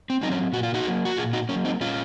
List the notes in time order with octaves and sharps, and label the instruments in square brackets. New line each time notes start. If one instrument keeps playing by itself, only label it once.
[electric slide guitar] C4
F#3 C4 D#4
C#4
A#2 F#4
F4
D#4 F#4
F#3 A#3
F#4
A#2 F4 G#4
D#4 F#4
F#3 A#3 C#4
C4 D#4
A#2 C#4 F4